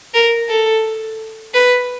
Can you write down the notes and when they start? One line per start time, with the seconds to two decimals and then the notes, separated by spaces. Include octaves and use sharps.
0.14 A#4
0.49 A4
1.54 B4